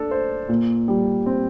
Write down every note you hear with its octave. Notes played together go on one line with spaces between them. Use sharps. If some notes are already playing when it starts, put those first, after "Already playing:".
Already playing: D4 A4
C5
A#2
G3
C4